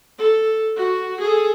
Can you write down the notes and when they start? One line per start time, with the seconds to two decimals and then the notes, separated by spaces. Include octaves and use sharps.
0.19 A4
0.76 F#4
1.20 G#4 A4